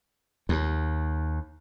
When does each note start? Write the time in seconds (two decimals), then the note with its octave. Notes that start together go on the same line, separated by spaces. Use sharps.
0.49 D#2